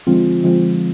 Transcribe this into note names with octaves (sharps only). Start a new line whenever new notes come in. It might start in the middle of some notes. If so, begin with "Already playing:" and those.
D3 F3 G#3 C4 F4
D3 F3 G#3 C4 F4